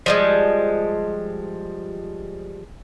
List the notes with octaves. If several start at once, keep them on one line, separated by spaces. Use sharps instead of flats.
F3 G3 G#3